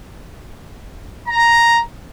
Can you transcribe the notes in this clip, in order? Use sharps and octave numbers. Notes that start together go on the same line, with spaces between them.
A#5